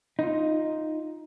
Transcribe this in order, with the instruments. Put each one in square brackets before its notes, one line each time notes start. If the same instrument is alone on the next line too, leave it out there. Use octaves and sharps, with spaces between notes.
[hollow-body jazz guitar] D#4 F4